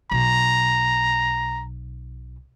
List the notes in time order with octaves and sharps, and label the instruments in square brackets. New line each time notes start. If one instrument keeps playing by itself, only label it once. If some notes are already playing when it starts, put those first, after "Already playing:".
[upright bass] B1 [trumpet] A#5